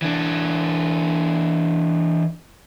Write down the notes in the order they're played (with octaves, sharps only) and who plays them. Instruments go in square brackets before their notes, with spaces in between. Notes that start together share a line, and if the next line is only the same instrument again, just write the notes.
[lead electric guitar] E3 D4